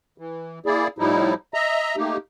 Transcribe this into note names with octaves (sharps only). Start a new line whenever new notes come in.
E3
A#3 E4 G#4 D5
A2 F3 G3 D#4 E4
D#5 E5 A#5
A3 A#3 D#4 G4